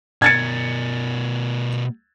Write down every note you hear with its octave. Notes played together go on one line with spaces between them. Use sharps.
B2 A#4 G#6 A6 C#7